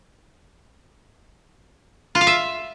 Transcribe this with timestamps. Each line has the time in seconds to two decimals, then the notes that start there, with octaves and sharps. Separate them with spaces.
2.15 F4
2.21 F5
2.27 E5